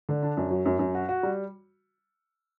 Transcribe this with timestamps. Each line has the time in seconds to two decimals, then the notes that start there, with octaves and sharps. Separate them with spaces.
0.09 D3
0.23 D4
0.37 F#2
0.51 F#3
0.66 F#2
0.79 F#2
0.95 F#4
1.09 F#4
1.23 G3